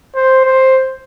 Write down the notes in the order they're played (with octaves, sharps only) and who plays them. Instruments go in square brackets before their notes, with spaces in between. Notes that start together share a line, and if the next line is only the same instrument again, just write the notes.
[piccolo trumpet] C5
C5